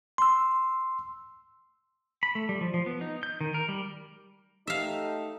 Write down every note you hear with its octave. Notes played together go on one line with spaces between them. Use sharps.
C6 E6
B5
A3
G3
F3
F3
B3
D#4
G6
D#3
A#4
G3
A3 D#4 G4 E5 F5